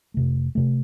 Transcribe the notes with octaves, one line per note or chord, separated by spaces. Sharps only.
F2 C3 A3
F1
F2 C3 A3